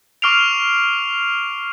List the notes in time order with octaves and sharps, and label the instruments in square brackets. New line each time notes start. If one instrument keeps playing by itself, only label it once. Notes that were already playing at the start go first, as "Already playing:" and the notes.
[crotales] C#6 D6 F6 C7 D7 F7